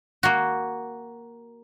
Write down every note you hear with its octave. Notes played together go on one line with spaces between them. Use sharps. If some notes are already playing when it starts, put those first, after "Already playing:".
A#3 F#4